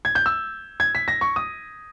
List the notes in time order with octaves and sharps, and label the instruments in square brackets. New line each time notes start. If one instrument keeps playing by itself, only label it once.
[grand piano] G#6
G6
E6
G#6
B6
A#6
C#6
D#6